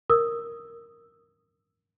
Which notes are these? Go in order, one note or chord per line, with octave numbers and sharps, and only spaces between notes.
A#4 D#6 E6